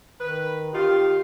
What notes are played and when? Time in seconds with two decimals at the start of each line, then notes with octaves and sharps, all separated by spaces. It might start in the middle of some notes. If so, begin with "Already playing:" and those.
0.20 D#3 B4
0.74 D#3 F4 G4